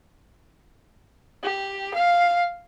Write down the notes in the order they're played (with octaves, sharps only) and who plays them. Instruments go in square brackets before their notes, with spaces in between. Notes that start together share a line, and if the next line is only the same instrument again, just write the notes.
[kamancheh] G4
F5